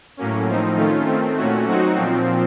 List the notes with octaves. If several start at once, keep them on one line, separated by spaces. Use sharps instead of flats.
A2 F#3 A#3 C#4
A2 F3 C4 D#4
D#3 A3 C#4 F4
D#3 A3 C4
A#2 A3 C#4 F#4
F#3 C4 D#4 F#4
A#2 F3 C4